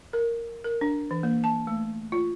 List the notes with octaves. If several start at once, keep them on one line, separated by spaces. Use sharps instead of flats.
A#4
A#4
D4
E3
A#3
A5
A3
F4